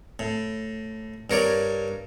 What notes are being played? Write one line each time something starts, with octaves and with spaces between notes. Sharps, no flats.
A2
G2 A#4 C#5 D5